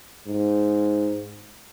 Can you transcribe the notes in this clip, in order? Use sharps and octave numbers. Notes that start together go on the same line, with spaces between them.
G#2